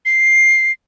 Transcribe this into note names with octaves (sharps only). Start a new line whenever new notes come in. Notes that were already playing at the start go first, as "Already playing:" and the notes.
C7